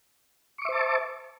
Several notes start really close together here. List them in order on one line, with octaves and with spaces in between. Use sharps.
C#6 D6 E5 C5 A5